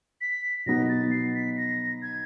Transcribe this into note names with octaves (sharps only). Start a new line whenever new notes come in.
B6
B2 F#3 B3 D#4 A#6
A6
C7
B6
A#6
G#6